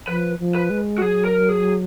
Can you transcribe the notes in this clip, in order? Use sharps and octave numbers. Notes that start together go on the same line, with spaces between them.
F3 B4
F3
B4
G#3
F#4
F#3 G#4
A#4
G#4